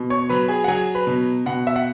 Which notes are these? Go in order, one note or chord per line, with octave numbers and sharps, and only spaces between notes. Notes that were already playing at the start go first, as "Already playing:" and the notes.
Already playing: B2
C#5 C#6
F#3 B4 B5
G#4 G#5
F#5
F#3 G#4 G#5
B4 B5
B2
B2 F#5
E5
F#5